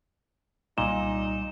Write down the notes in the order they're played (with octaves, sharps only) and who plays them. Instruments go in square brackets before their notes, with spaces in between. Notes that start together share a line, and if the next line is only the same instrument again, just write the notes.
[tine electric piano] C2 G3 [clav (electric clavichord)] A#2 [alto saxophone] D#4 [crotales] E7